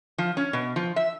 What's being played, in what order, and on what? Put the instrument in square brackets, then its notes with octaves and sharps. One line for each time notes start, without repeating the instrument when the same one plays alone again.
[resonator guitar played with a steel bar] F3
C#4
B2
F3
E5